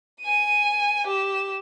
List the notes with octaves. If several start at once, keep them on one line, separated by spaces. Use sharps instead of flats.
G#5 D#7
G4 E7